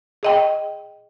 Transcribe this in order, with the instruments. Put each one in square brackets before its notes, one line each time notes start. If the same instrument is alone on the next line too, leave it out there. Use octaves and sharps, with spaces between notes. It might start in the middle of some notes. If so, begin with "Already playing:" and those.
[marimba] G#4 D#5 G5